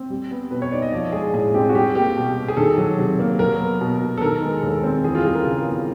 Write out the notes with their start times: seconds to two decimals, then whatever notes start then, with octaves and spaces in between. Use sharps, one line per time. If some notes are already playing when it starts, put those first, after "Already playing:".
Already playing: C4
0.10 G3
0.31 B3
0.51 B2 B4
0.62 C#5
0.72 D#4 D5
0.82 D#5
0.92 F3 D5
1.12 G#3 G#4
1.33 A2 G#4
1.54 C4 G4
1.69 F#4
1.74 G3 G4
1.95 A#3 G4
2.17 B2
2.37 B2
2.48 G#4
2.57 D#3 A4
2.78 F#3
2.98 C3
3.19 A#3
3.39 F#3 A#4
3.60 B3
3.81 B2
4.01 B2
4.18 A4
4.22 D#3 A#4
4.42 G#3
4.63 D#2 A4
4.84 C4
5.04 E3 G#4
5.15 F4
5.25 G3 G#4
5.35 A#4
5.45 C#3
5.66 B3